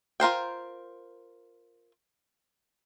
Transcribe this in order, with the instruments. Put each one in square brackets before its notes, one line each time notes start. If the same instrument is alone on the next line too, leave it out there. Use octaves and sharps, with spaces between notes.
[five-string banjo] F4 A#4 C5 G5